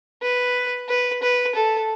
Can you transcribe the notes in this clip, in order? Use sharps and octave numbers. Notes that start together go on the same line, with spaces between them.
B4
B4
B4
A4